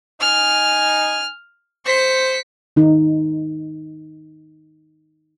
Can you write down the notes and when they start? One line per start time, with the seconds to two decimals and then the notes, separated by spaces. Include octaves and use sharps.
0.21 D#4 G#5 F6
1.86 C5 B6 C#7
2.76 D#3 D#4